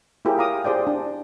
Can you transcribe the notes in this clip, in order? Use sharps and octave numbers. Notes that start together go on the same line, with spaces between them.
E4 F4 G4 G#4 A#4 C#5
F5 A#5 D6 D#6
G4 G#4 C5 D5 G5
D4